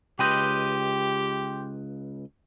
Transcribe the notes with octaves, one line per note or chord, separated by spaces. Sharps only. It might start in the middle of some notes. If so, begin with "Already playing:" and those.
C#2 G4 B4 D#5 G5 C6 G6